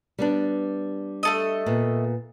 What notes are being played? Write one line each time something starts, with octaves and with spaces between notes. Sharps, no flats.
G3 B3 D4
A3 A4 D#5
A#2 B3